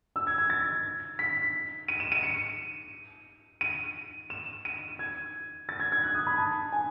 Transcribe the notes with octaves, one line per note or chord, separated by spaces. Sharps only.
E6
G#6
G#6
A6
B6
D#7
E7
D#7
C#7
D#7
E7
D#7
G#6
A6
G#6
G#6
F#6
D#6
B5
A5
G#5